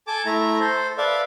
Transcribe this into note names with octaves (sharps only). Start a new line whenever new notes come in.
A4 G#5 A5 D6
A3 E4 A#5
A4 C5
A4 B4 D5 E5 F5